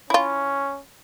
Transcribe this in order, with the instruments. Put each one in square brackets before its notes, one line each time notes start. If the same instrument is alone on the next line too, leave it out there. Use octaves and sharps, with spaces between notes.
[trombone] C#4 [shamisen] E4 F4